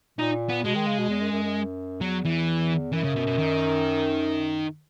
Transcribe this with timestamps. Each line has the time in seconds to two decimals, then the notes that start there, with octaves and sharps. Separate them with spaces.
0.19 A#2 D#4
0.49 B3
0.64 B2 G#3
0.75 D#3
0.87 C#3
0.99 B2
1.09 E2
1.21 F#2
1.32 F#2
1.43 F#2
2.01 E2 F#3
2.25 E3
2.93 F#2 E3
3.04 C#3
3.16 B2
3.27 B2
3.38 D#3